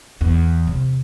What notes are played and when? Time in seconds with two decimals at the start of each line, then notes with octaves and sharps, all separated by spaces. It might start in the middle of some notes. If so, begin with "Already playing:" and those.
0.21 E2
0.67 C3